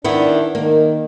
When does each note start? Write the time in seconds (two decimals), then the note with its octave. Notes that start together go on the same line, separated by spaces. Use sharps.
0.04 D#3 B3 D4 E4
0.55 D#3 A#3